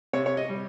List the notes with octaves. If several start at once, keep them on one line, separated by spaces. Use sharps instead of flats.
C3 C#5
C#5
D#5
G3